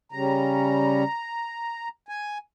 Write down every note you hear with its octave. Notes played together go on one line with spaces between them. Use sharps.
C#3 G3 C#4 A#5
G#5